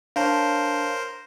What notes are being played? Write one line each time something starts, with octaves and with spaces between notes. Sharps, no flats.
D4 A#4 C5 C#5 F5 A5